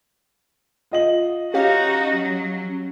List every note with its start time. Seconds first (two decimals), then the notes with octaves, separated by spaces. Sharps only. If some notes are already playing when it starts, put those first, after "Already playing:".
0.92 F4 D#5 F#7
1.54 C#4 D#4 F#4 G4 C#5 F5
2.15 F#3